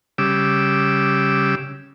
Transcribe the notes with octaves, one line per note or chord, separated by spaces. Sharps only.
C#3 G3 D6 E6